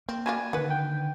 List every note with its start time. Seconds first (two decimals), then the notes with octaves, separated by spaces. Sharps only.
0.09 A#3 C4
0.26 F#3 G3 F4 G#5
0.53 D3 D#3 B4 F#5
0.70 G5